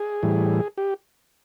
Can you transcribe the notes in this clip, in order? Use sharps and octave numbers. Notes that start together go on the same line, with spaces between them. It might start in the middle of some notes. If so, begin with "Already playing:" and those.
Already playing: G#4
A2 E3 G3
G4